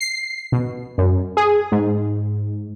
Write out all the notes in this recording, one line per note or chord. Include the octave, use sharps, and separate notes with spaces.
C7
B2
F#2
G#4
G#2